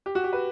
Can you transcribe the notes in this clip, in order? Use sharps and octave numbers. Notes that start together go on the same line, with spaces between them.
G4
F#4
G4
B4